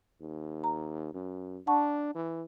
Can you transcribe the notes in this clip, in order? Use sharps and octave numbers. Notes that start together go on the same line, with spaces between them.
D#2
A#5
F#2
D4 F#5 A5 C#6
E3